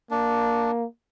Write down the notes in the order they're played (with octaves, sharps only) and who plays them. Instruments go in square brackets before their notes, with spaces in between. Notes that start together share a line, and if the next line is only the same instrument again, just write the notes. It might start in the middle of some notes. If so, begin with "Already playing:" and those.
[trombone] A#3 [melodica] D4